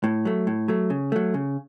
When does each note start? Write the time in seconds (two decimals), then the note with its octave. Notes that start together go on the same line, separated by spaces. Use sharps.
0.04 A2
0.25 F#3 A3
0.47 A2
0.68 F#3 A3
0.90 C#3
1.12 F#3 A3
1.34 C#3